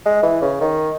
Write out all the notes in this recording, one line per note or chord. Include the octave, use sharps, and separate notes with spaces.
G#3
E3
C#3
D#3